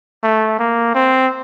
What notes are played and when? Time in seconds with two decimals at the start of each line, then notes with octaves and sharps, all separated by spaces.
0.23 A3
0.59 A#3
0.95 C4